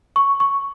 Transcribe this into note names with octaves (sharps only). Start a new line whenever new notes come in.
C#6
C#6